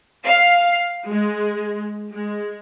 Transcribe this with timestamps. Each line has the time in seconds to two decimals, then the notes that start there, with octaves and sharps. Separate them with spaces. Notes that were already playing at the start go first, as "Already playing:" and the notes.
0.24 F5
1.09 G#3
2.12 G#3